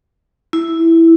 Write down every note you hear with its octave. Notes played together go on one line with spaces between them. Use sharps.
E4